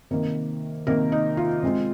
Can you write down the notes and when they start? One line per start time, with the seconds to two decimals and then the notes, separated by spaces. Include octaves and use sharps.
0.11 C3 D#3 A#3 A#4
0.87 C3 D#3 A#3 A#4
1.12 D#4
1.37 F4
1.63 C3 G#3 C4